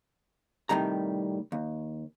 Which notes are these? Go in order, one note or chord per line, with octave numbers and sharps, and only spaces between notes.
A2 C3 D#3 G3 A#5
D#2